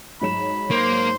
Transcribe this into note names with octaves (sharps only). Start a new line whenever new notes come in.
G#2 F#3 B5 E7
A#3 C5